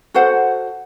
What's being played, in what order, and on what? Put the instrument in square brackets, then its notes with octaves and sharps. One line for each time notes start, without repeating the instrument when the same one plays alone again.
[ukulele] F#4 A4 C5 F#5